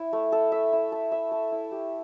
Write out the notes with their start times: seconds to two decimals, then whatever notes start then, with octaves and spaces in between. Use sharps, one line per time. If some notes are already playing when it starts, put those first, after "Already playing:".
Already playing: E4
0.13 A3
0.32 A4
0.52 E5
0.73 E4
0.92 A4
1.12 E5
1.32 A4
1.52 E4
1.71 G4